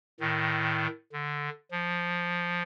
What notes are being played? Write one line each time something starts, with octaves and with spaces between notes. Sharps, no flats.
A2 D#3
D3
F3